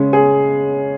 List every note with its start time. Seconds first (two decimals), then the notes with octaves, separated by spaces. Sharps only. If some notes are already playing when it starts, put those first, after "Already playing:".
Already playing: C#3 G#3 C#4
0.13 G#4